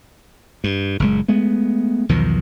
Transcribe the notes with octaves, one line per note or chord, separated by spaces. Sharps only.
G2
F#1 A#2 G#3
G#3 A3 B3
B1 E2 D#3 F3